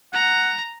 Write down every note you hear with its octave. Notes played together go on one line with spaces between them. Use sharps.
F#5 A#5